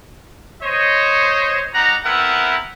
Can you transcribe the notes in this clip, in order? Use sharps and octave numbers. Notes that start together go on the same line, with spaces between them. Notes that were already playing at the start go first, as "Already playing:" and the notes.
C5 C#5 D#5
G3 D#4 F#5 A#5
B3 C4 E4 A#4 E5 F#5